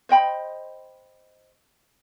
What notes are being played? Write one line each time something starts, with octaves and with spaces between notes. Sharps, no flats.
C5 D#5 G5 B5